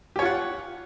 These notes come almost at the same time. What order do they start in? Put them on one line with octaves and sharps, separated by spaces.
G4 C#5 F4 F#5